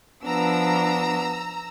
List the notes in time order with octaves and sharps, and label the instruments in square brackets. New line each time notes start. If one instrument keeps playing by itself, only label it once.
[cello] F3 D4 [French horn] B3 [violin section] A#5 E6